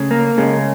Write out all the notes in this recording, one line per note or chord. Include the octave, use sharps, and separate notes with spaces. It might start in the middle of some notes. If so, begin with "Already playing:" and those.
Already playing: C#3 A3
A#3
C#3 G#3